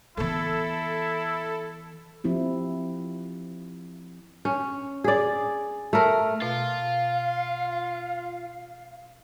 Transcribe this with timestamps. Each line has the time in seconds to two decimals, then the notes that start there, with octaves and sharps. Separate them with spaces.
0.17 E3 B3 E4 A4
2.24 F3 C4 E4 G4
4.45 C#4
5.04 G#4 D5
5.93 A3 A#4
6.42 B2 F4 F5